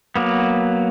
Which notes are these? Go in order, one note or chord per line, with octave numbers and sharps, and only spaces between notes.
F#3 A#3 B3